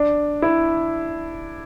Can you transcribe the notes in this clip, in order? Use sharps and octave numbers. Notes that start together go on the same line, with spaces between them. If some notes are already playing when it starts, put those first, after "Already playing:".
Already playing: D4
E4